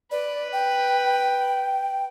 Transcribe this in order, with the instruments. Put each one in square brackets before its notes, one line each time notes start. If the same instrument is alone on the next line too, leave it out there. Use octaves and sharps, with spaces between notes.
[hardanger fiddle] B4 [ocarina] D5
[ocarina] G5